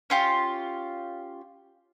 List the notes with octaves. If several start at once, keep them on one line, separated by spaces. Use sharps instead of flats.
C#4 F4 G4